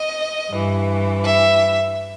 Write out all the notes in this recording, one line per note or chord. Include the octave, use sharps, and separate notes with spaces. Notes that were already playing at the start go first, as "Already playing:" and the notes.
Already playing: D#5
G2 E3
E5